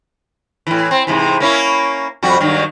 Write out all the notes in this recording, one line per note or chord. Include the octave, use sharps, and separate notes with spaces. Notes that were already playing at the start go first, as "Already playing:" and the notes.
A2 E3
C4
G#2 C3 E3
A#3 C#4 E4
F2 G3 F#4
G2 D#3 F#3